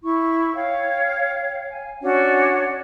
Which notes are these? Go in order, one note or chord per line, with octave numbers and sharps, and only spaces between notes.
E4 C#6
C#5 F5 G5
G#5
C#4 D4 F#4 C#5